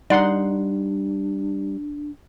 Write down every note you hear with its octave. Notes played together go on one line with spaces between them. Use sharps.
G3 D4 D#4 D5 F#5 C6